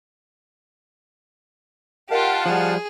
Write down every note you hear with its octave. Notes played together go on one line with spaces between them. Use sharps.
F4 G4 A#4 D#5 F5 F#5 A5
F3 G3 G#4